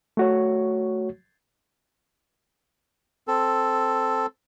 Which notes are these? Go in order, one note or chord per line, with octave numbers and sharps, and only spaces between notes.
A3 F#4 C#5
C4 A4